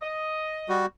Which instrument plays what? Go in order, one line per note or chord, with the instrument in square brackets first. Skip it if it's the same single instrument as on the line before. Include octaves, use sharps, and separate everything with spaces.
[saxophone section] D#5
[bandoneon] G3 F#4